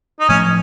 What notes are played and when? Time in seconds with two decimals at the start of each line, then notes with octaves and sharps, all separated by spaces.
0.20 D#4
0.29 A2 F3 A3 C#4